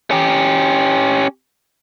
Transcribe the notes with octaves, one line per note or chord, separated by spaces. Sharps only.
C#4 G4